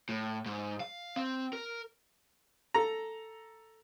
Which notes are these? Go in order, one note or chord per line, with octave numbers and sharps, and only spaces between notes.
A2
G#2
F5
C4
A#4
A4 A#5